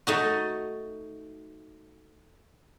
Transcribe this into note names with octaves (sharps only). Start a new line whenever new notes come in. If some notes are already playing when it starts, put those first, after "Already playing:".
A3 D#4 F#4